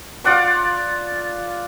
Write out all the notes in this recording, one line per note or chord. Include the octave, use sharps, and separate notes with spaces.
F4 D5 F#5 D6